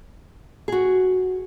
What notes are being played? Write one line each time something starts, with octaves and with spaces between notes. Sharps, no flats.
F#4 G#4